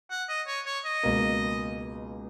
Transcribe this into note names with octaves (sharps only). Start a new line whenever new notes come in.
F#5
D#5
C#5
C#5
D#5
C#2 B2 A#3